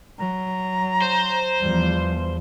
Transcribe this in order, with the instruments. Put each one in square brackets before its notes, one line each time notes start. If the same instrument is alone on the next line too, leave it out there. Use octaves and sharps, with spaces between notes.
[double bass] F#3 [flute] A#5
[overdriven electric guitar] C5
[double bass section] E2 F3 [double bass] G3